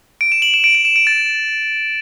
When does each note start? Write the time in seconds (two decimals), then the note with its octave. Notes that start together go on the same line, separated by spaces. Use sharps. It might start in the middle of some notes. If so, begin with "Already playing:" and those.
0.21 D7
0.32 E7
0.42 F#7
0.54 E7
0.64 D7
0.75 D7
0.85 E7
0.96 D7
1.07 A6